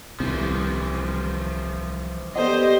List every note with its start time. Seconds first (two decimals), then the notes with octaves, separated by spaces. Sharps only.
0.20 D#1 C2 E3 F3
2.36 B3 G4 A4 C5 D5 D#5